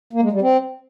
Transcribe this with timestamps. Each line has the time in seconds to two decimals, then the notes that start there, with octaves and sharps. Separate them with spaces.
0.13 A#3
0.23 G#3
0.32 G3
0.42 C4